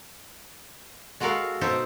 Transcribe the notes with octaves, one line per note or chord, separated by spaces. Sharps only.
G#3 F#4 A4 A#4 F5 F#5
B2 D#4 A4 C5 E5